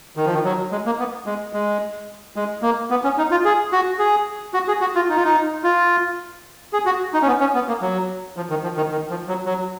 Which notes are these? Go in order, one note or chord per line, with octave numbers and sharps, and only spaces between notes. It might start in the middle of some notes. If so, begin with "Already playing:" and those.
D#3
F3
D#3
F#3
G#3
A#3
B3
G#3
G#3
G#3
A#3
B3
C#4
D#4
F4
G#4
F#4
G#4
F#4
G#4
F#4
F4
D#4
F4
D#4
F4
G#4
F#4
D#4
C#4
B3
C#4
B3
A#3
F#3
F3
D#3
F3
D#3
D#3
F3
F#3
F#3